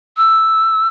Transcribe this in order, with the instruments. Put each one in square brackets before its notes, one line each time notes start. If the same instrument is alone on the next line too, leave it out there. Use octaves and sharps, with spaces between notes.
[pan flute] E6